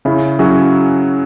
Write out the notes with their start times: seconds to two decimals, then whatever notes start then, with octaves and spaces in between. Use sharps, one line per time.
0.05 C#3 C#4 E4
0.39 F#3 C#4 E4 F#4 G#4